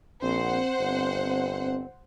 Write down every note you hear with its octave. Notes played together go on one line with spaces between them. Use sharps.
A#1 C4 C5 F#5
G1